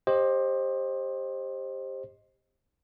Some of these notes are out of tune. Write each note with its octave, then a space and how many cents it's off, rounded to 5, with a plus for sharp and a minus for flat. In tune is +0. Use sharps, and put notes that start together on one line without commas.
G4 +15 C5 +20 D#5 +0